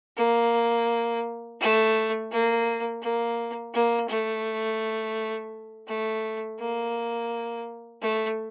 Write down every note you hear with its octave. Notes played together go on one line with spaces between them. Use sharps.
A#3
A3
A#3
A#3
A#3
A3
A3
A#3
A3